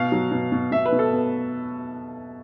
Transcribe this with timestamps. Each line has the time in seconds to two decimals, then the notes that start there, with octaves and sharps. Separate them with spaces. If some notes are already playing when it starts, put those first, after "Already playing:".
Already playing: B2 F5
0.12 F#3
0.31 B2
0.52 B2
0.72 B2 E5
0.86 B4
0.92 B2
0.99 A4
1.12 B3